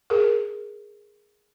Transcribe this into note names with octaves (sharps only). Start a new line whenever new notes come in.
G#4 A#4